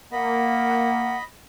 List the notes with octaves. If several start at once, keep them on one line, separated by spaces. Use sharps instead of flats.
A#3 D#5 F#5 B5